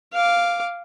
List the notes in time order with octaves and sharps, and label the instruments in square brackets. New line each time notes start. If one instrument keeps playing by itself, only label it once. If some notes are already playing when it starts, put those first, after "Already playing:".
[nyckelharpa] F5 D6